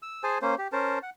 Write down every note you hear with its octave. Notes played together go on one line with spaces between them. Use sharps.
E6
G#4 C5 G#5 A5
A#3 C#4 C5
G4
C#4 A#4 C5 A5
F#5